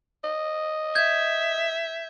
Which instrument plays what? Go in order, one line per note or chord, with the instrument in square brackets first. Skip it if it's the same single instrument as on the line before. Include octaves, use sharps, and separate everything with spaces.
[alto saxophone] D#5
[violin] E5 [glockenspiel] G6 G#6